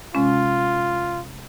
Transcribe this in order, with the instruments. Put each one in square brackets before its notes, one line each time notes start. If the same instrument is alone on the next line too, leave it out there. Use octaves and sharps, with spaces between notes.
[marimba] C3 G#3 C#4 [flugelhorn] F4